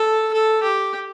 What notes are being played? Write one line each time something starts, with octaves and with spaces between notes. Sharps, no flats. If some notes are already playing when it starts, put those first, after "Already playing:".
Already playing: A4
A4
G4